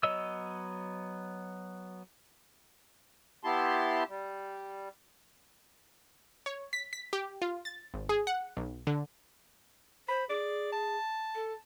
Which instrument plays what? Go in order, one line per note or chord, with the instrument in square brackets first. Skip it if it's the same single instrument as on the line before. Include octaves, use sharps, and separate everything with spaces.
[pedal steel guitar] F#3 B3 C#5 D#5 E6
[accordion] B3 E4 G4 A5 C6
G3
[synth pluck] C#5
B6
B6
G4
F4
A6
G#1
G#4
F#5
B1
D3
[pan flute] C5 [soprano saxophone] B5
[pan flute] G#4 [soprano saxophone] D5
[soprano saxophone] A5
[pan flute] A4